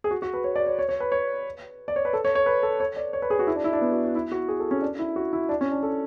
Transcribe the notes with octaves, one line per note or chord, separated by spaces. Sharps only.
G#4
F#4
F#4
B4
C#5
D5
C#5
C#5
C#5
B4
C#5
D5
C#5
B4
A4
C#5
C#5
B4
A4
C#5
D5
C#5
B4
G#4
F#4
E4
D4
E4
D4
B3
F#4
F#4
E4
F#4
G#4
A4
C#4
D4
E4
F#4
E4
D4
C#4
D4
A4